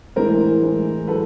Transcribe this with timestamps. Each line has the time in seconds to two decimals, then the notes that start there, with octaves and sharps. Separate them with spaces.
0.16 A2 E3 G#3 A#4 C5
0.62 A2 E3 G#3
1.07 A2 F#3 A4 B4